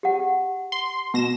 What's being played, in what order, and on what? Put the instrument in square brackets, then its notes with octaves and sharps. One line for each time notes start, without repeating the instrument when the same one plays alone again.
[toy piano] G4 F#5
[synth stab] C6
B2 A#6 E7